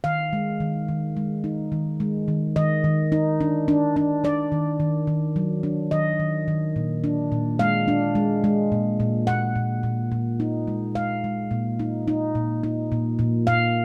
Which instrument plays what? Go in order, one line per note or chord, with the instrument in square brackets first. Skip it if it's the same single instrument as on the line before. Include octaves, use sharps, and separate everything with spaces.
[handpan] D#3 F5
G#3
D#3
D#3
G#3
D#4
D#3
G#3
D#3
D#3 D#5
D#3
D#4
D4
D4
D4
D4 D5
D#3
D#3
D#3
F#3
D4
D#3 D#5
D#3
D#3
A#2
D4
A#2
G#3 F5
D4
G#3
G#3
A#2
A#2
A#2 F#5
A#2
A#2
A#2
D#4
G#3
G#3 F5
G#3
A#2
D#4
D#4
A#2
D#4
A#2
A#2
A#2 F5